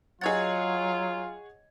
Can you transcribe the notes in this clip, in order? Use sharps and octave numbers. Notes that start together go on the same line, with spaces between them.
F#3 F4 G#4 C#5 D#5 F#5 G#6 A6